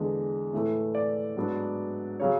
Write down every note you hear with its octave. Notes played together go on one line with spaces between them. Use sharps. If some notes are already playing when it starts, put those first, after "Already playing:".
Already playing: E2 D3 G#3 D4
A2 E3 A3
D5
G#2 F#3 B3 D4
C#3 F#3 C#5